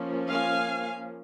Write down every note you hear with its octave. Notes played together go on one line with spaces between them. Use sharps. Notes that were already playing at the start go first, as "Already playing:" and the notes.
Already playing: F3 A#3 C#4
F5 G#5